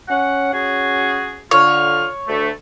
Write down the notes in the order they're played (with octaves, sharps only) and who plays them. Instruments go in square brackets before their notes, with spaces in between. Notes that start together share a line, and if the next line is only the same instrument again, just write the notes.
[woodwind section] C#4 F#5
C#4 F#4 G#4
[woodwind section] D3 F4 F6 [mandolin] C#5
[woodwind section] D2 A3